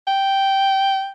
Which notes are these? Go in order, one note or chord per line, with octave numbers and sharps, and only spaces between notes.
G5